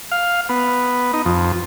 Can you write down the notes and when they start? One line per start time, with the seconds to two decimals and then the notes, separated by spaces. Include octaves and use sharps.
0.12 F5
0.49 B3
1.13 D#4
1.25 F2